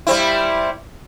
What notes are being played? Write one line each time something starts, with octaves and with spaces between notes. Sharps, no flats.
G3 C4 E4